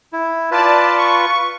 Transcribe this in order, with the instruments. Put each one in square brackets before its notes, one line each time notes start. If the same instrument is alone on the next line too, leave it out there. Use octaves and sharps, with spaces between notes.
[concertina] E4
[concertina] F4 B4 [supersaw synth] D5 A5
[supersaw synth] C#6